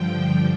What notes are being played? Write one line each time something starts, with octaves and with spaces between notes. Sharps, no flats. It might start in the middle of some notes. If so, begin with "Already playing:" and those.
Already playing: G2 D3 F3 G5